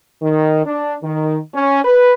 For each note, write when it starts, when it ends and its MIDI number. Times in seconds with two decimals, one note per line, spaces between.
0.22 0.64 51
0.65 0.95 62
1.03 1.37 51
1.55 1.80 61
1.84 2.12 71